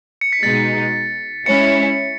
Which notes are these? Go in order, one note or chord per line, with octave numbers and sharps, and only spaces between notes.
C#7
B6
B2 G#3 D#4 A6
G#3 C#4 E4 C#7